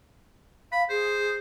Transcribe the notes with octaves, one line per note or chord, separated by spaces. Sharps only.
F5 B5
G#4 C5